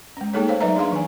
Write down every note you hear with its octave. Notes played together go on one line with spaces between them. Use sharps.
G#3 C#4
A3 A#3 D#4 G#4 A4 C#5
C5 C#5 F5
F#3 D#4 B4 D5 E5 A#5
D4 G#4 F5 C6
E3 G#5